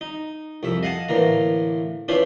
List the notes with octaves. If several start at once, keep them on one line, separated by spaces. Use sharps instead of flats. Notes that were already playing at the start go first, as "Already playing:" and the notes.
D#4
C2 F2 E5
D#5 F5 F#5 G#5 A5
A2 D3 E3 A#3 A#5
C#4 D4 E4 F4 B4 C5